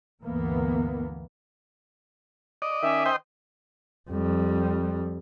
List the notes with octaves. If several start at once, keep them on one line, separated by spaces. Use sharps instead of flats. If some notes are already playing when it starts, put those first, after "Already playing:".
D2 G2 E3 A#3 B3
D5 D#5
D#3 C#4 E5
C5 D#5 G5
F2 G3